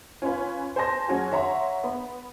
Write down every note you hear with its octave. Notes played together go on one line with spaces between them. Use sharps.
C#4 F4 B4
C5 G#5 A5 C6 A#6
F#3 C#4 F#4 G#4
C#5 E5 F#5 A#5 C6
B3